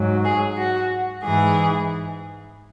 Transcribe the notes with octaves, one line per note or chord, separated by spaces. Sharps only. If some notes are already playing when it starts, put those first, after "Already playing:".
Already playing: G#2 F#3
G#4
F#4
G#2 E3 G#4